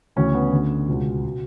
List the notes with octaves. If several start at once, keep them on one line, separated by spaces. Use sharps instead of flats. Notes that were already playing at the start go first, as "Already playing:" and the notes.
D2 C#3 E3 C#4
B3
D2 D3
C#2 B2
B2